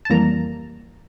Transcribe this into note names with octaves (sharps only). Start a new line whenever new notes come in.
A5
F2 E3 G3 A#3 A#5